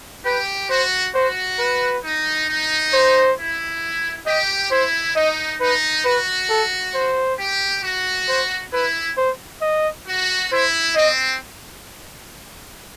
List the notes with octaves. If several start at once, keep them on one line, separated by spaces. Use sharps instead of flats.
G4 B4
F#4 C5
F#4 C5
B4
D#4
D#4
C5
E4
G4 D#5
E4 C5
D#4 D#5
D#4 B4
F#4 B4
A4
C5
G4
F#4
C5
E4 B4
C5
D#5
F#4
E4 C5
C4 D#5